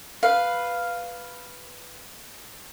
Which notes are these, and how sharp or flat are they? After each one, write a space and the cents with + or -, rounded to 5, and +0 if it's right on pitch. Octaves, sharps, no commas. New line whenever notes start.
B4 +0 F5 +0